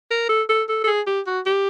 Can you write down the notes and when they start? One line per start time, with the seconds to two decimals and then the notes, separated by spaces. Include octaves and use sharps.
0.11 A#4
0.29 A4
0.49 A4
0.69 A4
0.84 A4
0.87 G#4
1.07 G4
1.27 F#4
1.46 G4